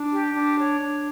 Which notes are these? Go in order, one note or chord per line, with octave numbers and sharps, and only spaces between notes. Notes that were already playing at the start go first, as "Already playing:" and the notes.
Already playing: D4
G4
D4
C#5
D4